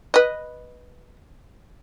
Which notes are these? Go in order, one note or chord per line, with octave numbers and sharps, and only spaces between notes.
B4 D#5